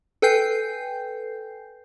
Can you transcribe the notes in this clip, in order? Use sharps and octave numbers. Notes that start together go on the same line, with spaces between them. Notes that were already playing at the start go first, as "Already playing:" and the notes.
A4 B4 G5 G#5 G6 C7